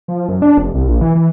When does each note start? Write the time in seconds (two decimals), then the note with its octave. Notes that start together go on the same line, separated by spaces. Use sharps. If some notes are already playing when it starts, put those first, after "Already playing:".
0.08 F3
0.29 F#2
0.42 D4
0.58 F1
0.74 C2
0.87 A#1
1.01 E3
1.15 E3